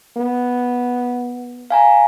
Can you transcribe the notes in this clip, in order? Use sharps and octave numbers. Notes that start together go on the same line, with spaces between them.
B3
F5 G#5 A#5